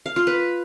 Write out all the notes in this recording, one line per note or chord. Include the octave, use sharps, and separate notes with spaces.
F5
F4
B4